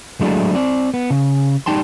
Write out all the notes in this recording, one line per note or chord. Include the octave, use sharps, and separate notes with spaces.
F#3 G#3 A3 D4 E4
C4 D5
B3
C#3
G3 D#4 G5 A5 C6